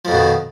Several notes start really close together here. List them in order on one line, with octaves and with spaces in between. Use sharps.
F3 F2 B2 D#3